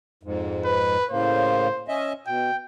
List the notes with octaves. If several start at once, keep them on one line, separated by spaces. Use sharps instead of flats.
F2 G#2
B4
A2 C#3 A#3 C5
C#4 D#5 E5
B2 G5